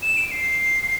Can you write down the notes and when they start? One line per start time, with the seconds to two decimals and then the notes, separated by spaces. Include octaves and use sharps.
0.02 E7
0.17 D7
0.31 C7